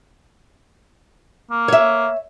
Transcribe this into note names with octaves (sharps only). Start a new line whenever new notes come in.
A#3
C#5 E5